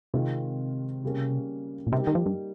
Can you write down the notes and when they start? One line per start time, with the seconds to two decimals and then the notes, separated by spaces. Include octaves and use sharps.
0.14 C3 D#3 G#3 C4 F4
1.04 C#3 G3 A#3 C#4
1.87 A#2
1.92 C3 G3 A#3 D#4 G4
2.07 D#3
2.15 F3
2.26 G2